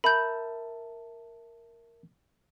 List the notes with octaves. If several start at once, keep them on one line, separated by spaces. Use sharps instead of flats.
A#4 E5 A5 B5 G6